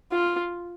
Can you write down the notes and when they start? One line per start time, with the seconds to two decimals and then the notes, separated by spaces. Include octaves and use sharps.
0.12 F4